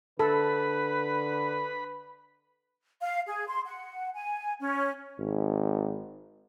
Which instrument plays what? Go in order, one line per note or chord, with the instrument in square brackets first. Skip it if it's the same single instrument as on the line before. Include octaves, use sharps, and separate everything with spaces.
[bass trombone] D3 [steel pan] A4 [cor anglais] B4 [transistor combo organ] B5
[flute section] F5
G#4
C6
F#5
G#5
C#4
[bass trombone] G#1